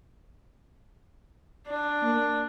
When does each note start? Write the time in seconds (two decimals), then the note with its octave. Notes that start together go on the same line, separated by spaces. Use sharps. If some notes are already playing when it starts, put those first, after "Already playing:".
1.70 D4
2.03 A#3